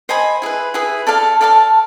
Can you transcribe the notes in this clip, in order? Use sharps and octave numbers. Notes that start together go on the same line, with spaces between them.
C5 D#5 G#5 B5
E4 G#4 B4
E4 G#4 B4
A4 D5 F5 A5
A4 D5 F5 A5